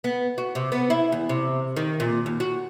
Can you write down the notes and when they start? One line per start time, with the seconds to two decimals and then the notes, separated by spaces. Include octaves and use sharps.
0.04 B3
0.38 F#4
0.55 C3
0.72 B3
0.90 E4
1.12 E2
1.29 C3
1.76 D#3
2.00 A#2
2.26 D#2
2.40 F#4